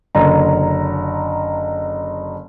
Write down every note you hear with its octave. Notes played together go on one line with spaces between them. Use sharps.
F#1 D3 A#5